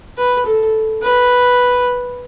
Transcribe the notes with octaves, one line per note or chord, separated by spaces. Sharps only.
B4
A4
B4